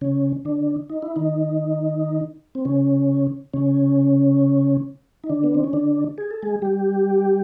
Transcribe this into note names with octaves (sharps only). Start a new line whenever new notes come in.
C#3 C#4
D3 D4
D#4
E4
D#3 D#4
C4
C#3 C#4
C#3 C#4
D#4
D3 D4
B3
C4
C#4
D3 D4
G#4
A4
G#3 G#4
G3 G4